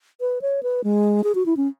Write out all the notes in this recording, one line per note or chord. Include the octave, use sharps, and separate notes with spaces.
B4
C#5
B4
G#3
G#4
F#4
E4
C#4